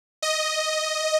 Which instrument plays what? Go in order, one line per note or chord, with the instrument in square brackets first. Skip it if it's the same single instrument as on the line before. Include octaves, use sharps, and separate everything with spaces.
[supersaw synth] D#5